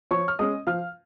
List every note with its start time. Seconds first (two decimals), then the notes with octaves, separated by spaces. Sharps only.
0.11 F3 C#5 C#6
0.28 F6
0.39 G#3 C#4 D#5 D#6
0.67 F3 F5 F6